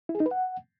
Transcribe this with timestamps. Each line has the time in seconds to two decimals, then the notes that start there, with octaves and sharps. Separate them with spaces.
0.09 E4
0.15 G#4
0.20 D#4
0.26 B4
0.31 F#5